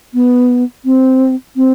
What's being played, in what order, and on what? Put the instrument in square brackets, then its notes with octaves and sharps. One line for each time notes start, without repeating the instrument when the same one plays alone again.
[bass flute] B3
C4
C4